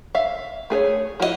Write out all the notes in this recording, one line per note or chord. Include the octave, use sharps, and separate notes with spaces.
E5 F5
A3 G#4 B4 C#5
F3 E4 F#4 G#4 D#5